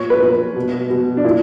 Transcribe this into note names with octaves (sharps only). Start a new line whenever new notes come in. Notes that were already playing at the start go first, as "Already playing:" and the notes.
Already playing: A#2 C#5
B4
A#2
B2
B2
D4
A#2 E4